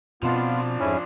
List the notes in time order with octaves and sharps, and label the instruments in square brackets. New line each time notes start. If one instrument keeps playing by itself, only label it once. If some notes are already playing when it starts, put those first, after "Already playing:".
[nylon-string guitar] B2 C4 A5 [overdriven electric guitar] F3 D4 [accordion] B3 F4
[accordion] F2 G#2 E4 [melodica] C#4